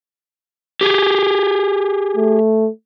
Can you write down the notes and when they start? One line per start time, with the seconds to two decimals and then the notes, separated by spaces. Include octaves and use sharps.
0.81 G4 G#4
2.17 A3